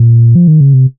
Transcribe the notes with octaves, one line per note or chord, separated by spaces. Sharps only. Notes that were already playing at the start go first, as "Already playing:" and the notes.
Already playing: A#2
F3
D#3
C#3
C3